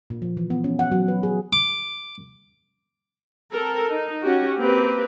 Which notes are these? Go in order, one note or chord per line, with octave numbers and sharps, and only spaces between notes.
A#2
F3
E3
B3
C#4
F#5
F#3
B4
G#4
D6
C4 A4 A#4
D#4
C#4 F#4 G4
A#3 C4 G4 B4